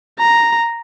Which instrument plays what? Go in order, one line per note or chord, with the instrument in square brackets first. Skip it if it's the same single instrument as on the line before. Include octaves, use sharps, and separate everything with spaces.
[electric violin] A#5